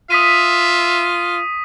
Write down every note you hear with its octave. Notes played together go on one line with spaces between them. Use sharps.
F4 E5 D#6 B6 D#7